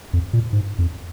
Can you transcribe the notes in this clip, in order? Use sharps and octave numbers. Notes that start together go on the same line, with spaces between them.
F2
A#2
G#2
F2